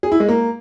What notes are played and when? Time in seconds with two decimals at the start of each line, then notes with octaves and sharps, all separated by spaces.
0.03 G#4
0.12 E4
0.20 G#3
0.29 A#3